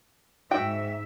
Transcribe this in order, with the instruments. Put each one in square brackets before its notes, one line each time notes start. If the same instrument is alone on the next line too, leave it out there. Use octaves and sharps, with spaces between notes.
[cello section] G#2 E5 [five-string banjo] F#4 G5